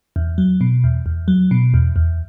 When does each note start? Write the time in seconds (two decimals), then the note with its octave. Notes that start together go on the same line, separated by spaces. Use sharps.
0.16 E2
0.38 F#3
0.61 B2
0.84 E2
1.06 E2
1.28 F#3
1.51 B2
1.74 E2
1.96 E2